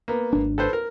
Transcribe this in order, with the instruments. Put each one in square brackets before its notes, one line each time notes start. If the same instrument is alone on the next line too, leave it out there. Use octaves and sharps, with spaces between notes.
[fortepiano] A#3 B3
[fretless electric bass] G#1 D4
[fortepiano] A4 B4 C5
A#4